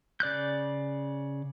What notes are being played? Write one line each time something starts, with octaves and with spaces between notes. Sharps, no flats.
C#3 D5 F#6 G6